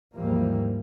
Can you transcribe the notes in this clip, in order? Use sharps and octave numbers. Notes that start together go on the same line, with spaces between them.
D#2 G#2 E3 F3 G3 A#3